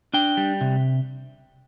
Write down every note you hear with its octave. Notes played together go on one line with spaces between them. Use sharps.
D4 G5
G3
C3